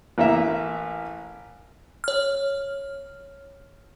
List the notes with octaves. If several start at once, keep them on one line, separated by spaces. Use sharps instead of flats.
A1 A#3 E5
C#5 F6